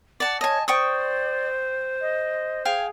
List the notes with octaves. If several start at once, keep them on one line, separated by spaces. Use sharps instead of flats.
D5 F#5 A5
C#5 D#5 G#5 A5
C5 D5 G5 C#6 D#6
D#5
G#4 F5 G5 G#5